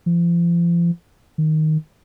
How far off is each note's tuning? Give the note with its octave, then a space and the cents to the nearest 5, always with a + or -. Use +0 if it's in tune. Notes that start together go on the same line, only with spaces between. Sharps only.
F3 -35
D#3 +0